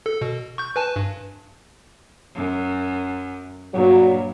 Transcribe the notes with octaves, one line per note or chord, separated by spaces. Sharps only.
A4
B2
C#6 G6
B4 G#5 A5
G2
F#2
G2 A#2 F#3